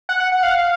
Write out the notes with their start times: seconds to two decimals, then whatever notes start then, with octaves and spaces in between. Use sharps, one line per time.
0.09 F#5
0.20 F#5
0.32 F#5
0.43 F5